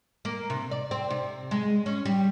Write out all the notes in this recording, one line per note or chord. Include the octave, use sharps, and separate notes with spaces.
A#3
C3
D5
C4
C3
G#3
C#4
G3